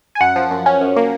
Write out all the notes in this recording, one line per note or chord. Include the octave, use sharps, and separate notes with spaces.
G#5
F#2 F#5
F3
F#2
C#4
F#2
A#3